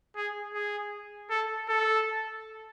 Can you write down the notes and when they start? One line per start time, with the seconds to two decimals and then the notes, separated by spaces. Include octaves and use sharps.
0.16 G#4
0.54 G#4
1.30 A4
1.69 A4